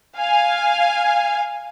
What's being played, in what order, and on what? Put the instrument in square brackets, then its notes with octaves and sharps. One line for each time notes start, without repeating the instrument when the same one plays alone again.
[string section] F5 G#5